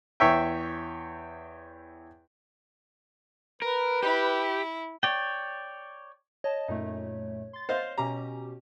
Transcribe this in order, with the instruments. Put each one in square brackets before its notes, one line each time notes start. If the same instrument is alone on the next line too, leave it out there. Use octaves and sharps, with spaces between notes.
[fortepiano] E2 C#5 E5 G5
[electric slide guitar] A#4 [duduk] B4
[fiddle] E4 [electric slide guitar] G4
[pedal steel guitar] C#5 D5 G5
[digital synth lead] C#5 [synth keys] D#5 A5
[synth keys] F#2 A#2 A3 [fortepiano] D#4
[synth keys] C6 A6
[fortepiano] C5 D#5 F5
[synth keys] B2 C#4 G4 [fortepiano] A#5